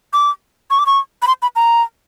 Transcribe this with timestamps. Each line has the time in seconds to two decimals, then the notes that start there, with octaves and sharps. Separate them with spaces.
0.13 D6
0.70 C#6
0.79 D6
0.86 C#6
1.22 B5
1.27 C6
1.42 B5
1.56 A#5